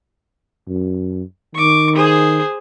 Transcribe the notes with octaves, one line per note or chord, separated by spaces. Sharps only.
F#2
D#3 C#6 D6
G#4 C5